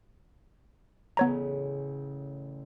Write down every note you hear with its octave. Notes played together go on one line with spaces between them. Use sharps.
A1 C#3 B3 C#5 A#5